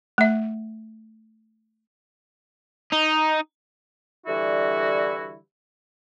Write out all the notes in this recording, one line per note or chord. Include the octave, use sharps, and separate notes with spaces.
A3 E5
D#4
D3 E3 G3 E4 F#4